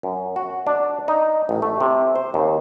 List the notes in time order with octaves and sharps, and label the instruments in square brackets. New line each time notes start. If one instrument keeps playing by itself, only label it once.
[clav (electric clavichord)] F#2
F#4
D4
D#4
A1
A3
C3
C5
D#2